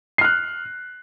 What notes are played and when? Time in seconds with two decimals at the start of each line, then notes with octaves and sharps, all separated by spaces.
0.18 C7
0.21 F6
0.24 F#6